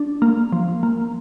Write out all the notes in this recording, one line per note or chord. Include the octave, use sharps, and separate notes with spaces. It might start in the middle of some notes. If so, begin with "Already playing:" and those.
Already playing: D4
A#3
F3
A#3